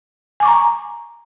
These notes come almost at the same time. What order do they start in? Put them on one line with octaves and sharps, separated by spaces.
G#5 D6 C#6 A#5